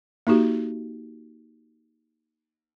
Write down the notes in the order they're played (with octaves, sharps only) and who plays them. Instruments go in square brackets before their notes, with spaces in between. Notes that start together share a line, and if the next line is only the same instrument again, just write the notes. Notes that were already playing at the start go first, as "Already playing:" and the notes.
[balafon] A#3 D#4 F#4 G4